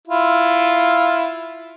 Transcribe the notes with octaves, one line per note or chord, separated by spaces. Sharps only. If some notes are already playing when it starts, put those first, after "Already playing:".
E4 F4